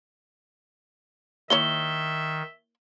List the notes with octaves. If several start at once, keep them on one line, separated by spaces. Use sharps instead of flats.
D#3 A#3 E4 C#5 E5 G7